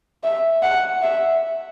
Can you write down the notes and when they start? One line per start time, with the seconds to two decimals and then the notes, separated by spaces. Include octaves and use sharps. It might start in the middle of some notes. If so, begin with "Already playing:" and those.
0.24 E5
0.63 F#5
1.02 E5